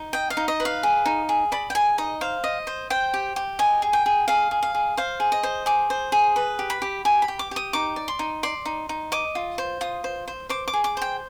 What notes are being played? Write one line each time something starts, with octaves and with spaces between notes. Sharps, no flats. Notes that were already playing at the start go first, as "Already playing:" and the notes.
Already playing: D#4
D#5 G5
F5
D#4
D#5
B4
F5
G#4
D#4
G#4
D5 B5
G5
G#4 G#5
D#4 D#5
C5 F5
D#5
C5
C5 G5
G4
G4
D#5 G#5
G#4
G5
G#4
G#4 F5
G#4
F5
G#4
C5 F5
G#4
D#5
C5
G#4 D6
C5
G#4
B4
G4
B5
G4
G4 G#5
B5
G4
D6
G4 D#6
D#4 D6
D5
C6
D#4
D5 C6
D#4
D#4
D#5 D6
F4
C5
F4 D#6
C5
C5
C5 D6
D6
G#4
D6
C5 G5